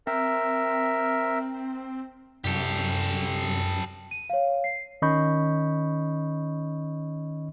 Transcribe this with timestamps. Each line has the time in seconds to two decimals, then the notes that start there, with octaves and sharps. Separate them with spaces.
0.07 C4 A#4 E5
2.44 C2 F#2 G4 A4
4.11 D#7
4.30 C#5 F5
4.64 C7
5.02 D#3 C#4 D#5 B5 C#6 G6